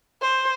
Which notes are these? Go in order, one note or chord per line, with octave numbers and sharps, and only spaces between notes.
C5